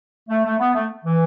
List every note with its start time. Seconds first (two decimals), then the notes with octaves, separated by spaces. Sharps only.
0.29 A3
0.45 A3
0.59 B3
0.74 A3
1.05 E3